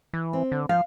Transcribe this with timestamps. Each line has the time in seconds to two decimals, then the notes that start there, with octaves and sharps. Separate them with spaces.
0.13 E3
0.33 C4
0.52 D3
0.69 F3 F5